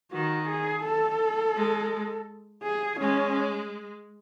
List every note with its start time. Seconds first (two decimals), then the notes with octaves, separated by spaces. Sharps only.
0.11 D#3 F#4
0.48 G#4
0.84 A4
1.56 G#3
2.63 G#4
3.00 G#3 C#4